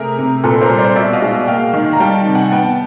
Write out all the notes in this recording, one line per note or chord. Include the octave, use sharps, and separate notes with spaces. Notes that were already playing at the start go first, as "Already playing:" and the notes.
Already playing: C3 A3 G#4 A#4
C3
A#2 A4 B4
A#4 C5
G3
C5 D5
B2 D5 E5
D#5 F5
G#3
A#3 F5 G5
D#3
A#5
G3 G5 A5
C3
F#5 G#5
B3 G5 A5